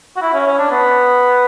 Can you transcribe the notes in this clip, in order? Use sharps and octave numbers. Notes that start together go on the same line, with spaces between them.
F#4
E4
C#4
C#4
D4
B3